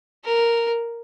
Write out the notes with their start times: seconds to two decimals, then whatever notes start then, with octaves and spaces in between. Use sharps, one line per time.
0.24 A#4